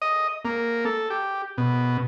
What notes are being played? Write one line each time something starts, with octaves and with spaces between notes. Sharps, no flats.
D#5
A#3
A4
G4
B2